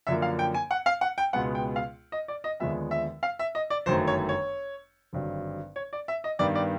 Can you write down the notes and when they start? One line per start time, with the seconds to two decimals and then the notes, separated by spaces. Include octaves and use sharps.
0.07 F#2 D3 F3 A#3 E5
0.22 F5
0.39 G5
0.54 G#5
0.71 F#5
0.86 F5
1.01 F#5
1.18 G5
1.33 C#2 B2 G#3 B3 F#5
1.55 G5
1.76 F5
2.12 D#5
2.28 D5
2.44 D#5
2.60 D#2 D3 F3 G#3 B3 E5
2.91 E5
3.23 F5
3.39 E5
3.55 D#5
3.70 D5
3.86 G1 F#2 D#3 F#3 A3 C5
4.07 C#5
4.29 C#5
5.13 G#1 G2 D3 F#3
5.76 C#5
5.93 D5
6.08 E5
6.24 D#5
6.39 G2 D#3 G3 B3 D5
6.55 D5